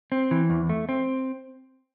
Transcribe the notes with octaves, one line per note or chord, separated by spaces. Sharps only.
C4
E3
E2
A3
C4